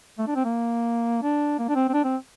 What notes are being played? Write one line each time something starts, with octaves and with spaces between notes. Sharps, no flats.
A3
D4
C4
A#3
D4
A#3
D4
C4
C4
D4
C4